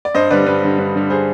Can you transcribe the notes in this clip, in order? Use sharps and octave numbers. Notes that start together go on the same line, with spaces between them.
D5
G2 C5 D#5
D3 G3 B4 D5
G2 B4
D3 G3
G2 B4
D3 G3
G#4 C5